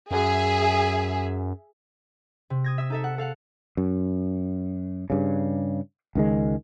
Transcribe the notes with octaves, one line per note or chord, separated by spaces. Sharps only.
F#2 G#4 E5
C3
D#6 G#6 A#6
E5 E6
D#4 A4 E5
F#5
A4 F5 F#5
F#2
G2 C#3
C#2 D#3 G#3